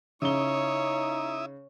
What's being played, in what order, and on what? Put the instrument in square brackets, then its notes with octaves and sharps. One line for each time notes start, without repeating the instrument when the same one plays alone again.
[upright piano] C#3 G7 [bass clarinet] D#4 [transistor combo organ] E4 E5 D#6 [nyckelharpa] C#5